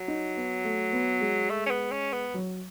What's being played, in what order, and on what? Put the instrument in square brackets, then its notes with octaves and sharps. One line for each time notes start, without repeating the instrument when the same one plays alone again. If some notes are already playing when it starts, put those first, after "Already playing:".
Already playing: [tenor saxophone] F#3
[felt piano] D#4
B3
A3
B3
G#3
[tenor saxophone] A3
C#4
B3
C#4
B3
[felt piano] F#3